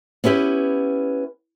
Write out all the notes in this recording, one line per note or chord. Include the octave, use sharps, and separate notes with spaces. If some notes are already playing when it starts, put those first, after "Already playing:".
B3 C#4 E4 G4 B4